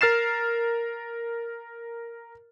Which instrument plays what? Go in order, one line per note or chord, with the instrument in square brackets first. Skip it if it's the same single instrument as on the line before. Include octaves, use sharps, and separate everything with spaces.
[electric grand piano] A#4 F6 A6 C7 E7